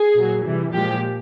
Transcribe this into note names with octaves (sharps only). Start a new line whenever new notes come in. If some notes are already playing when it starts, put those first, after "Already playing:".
Already playing: G#4
A#2 F#3
C3 E3 G3
A#2 F3 G#3 G4